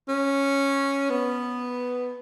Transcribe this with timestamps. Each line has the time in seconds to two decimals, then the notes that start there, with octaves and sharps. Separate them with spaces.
0.09 C#4
1.10 B3